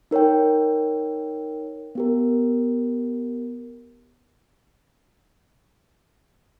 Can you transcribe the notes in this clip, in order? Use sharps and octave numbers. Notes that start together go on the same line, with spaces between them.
D#4 A#4 C#5 G5
B3 G4 A#4